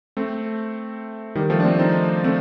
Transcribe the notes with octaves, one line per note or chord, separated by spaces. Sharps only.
A3 C4
D#3 G3
F3 A3
D4
A3 C4
C4 D#4
A3 C4